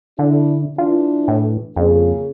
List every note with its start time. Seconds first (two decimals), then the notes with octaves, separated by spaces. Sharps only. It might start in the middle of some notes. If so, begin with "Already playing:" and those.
0.19 D3 D4 E4
0.78 E3 D4 F4
1.28 A2
1.76 F2 C#3 A#3 G#4